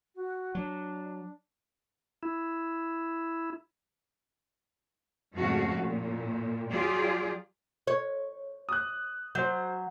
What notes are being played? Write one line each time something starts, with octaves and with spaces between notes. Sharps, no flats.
F#4
F#3 D4
E4
F2 G#2 C#3 A3 F#4 F5
A#2
F#3 F4 G4 G#4 D5
C#5
D#6 F#6
F#3 C5 G6